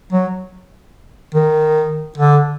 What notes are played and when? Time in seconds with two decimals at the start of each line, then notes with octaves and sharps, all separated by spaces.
0.13 F#3
1.35 D#3
2.18 D3